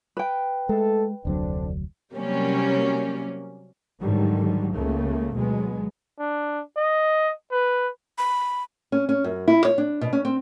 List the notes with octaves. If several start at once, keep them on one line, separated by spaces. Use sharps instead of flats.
B4 G5
G#3 A3 A4
F1 D2 D3 F#3 C4 D4
C3 F#3 G3 A#3 C#4
G#2 D3 D#3 F#3 G3
C#2 C#3 A3 A#3
D2 B2 F#3 G#3 B3
D4
D#5
B4
B5
C#4
C#4
F#2
E4
C#5
D4
B2
C#4
C4